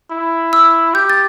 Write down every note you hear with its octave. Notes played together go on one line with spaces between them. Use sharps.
E4
E6
G4 G6
A6